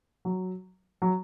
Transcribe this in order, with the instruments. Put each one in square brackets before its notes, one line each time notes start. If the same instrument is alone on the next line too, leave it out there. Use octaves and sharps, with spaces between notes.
[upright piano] F#3
F#3